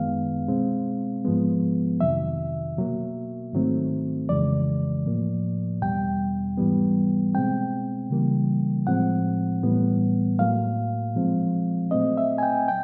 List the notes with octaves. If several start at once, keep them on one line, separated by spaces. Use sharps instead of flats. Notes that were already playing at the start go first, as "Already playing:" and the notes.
Already playing: F#2 D#3 G#3 B3 F5
B2 G#3 C4
G#2 F3 G#3 B3
F2 C3 D#3 F#3 E5
B2 F#3 A#3
G#2 D#3 F#3 A3 C4
F2 C#3 E3 G#3 D5
A2 F3 A#3
E2 B2 G3 G5
G#2 E3 G3 B3
B2 G#3 C4 G5
C#3 E3 G3 A#3
A2 F3 G#3 C4 F#5
A2 E3 G3 B3
A2 F#3 A#3 F5
A#2 F3 G#3 C4
A#2 F#3 A3 C4 D#5
E5
G#5
G5
G5